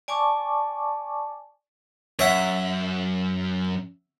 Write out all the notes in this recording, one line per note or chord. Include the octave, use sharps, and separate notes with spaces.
D5 G#5 A5 C#6 D6
F#2 C#5 E5 F#5